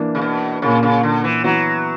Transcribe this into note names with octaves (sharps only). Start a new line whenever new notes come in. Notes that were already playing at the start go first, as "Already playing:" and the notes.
Already playing: E3 A#3 D4
C#3
B2
A#2 C#3 A#3 C#4
C#3
D3
E3
E3 F#3 B3 F#4